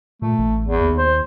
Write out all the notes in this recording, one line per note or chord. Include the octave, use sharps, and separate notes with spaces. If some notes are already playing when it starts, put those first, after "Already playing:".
A#2 A3
A1
E2
D#2
C5